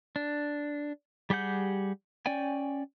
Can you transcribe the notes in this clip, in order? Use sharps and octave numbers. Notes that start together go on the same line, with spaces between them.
D4
G3 G4 G#4 F#5 G6
C#4 D5 G5 G#5